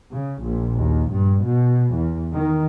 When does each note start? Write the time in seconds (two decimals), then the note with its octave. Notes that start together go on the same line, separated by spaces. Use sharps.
0.11 C#3
0.42 A#1
0.79 D#2
1.14 G2
1.46 B2
1.96 E2
2.35 D#3